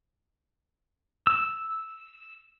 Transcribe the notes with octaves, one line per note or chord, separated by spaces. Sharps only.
E6